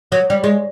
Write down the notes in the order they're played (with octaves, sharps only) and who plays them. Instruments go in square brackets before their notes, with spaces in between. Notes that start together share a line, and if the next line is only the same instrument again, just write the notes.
[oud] F#3 [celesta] C#5
[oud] G3 [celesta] D5
[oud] G#3